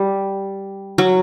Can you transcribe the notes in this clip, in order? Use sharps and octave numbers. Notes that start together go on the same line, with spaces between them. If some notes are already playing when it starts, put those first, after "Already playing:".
Already playing: G3
F#3